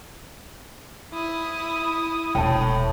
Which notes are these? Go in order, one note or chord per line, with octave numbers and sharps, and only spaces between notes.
E4 D#6
E1 A2 G5 A5